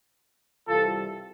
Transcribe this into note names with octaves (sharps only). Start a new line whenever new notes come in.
C2 C3 E3 F4 A4